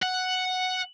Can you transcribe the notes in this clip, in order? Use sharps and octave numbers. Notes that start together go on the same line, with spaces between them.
F#5